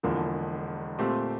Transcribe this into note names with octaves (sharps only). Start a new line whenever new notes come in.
E1 E2 D3 F3 A#3
A#2 A3 C4 G4